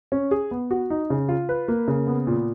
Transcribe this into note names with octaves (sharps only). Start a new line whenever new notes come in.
C#4
G#4
B3
F#4
D#4
C#3
F4
B4
A#3
C#3
B3
A#2